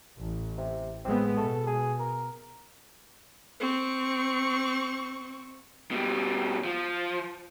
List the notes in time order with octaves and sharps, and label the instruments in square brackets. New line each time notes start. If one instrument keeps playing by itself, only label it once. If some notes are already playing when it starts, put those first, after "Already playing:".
[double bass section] A1
[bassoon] C3
[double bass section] A2 G#3 B3 [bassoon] C4
[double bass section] B2 [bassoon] A4
[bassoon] G#4
A#4
[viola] C4 C#6
[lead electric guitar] B2 G3
F3